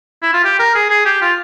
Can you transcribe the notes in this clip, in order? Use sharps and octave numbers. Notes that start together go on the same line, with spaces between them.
E4
F4
G4
A#4
G#4
G#4
G4
F4